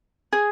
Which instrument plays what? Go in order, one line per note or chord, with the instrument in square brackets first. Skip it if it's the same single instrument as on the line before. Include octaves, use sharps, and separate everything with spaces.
[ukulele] G#4